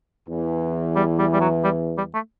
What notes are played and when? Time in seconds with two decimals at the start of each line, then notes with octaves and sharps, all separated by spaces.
0.28 E2 E3
0.96 G3
1.19 G3
1.33 G3
1.41 F#3
1.64 G3
1.97 G3
2.14 A3